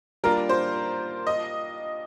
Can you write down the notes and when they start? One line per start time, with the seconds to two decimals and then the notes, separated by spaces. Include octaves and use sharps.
0.24 G3 A#3 D4 F4 A#4
0.49 C5
1.27 D#5